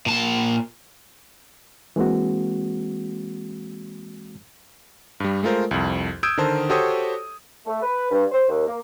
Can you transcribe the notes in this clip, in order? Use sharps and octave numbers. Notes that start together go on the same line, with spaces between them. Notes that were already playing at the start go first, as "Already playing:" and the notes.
A#2 A5
E3 G#3 A#3 C4 F#4
G2 G3
G#3 A3 F4 A#4 C5
C2 F2
D#6 E6 G6 G#6 D7
D3 D#3 A#4 C5 A5
F#4 G4 A4 C5 C#5 D#6
A3
B4
G2
C5
D#2
A#3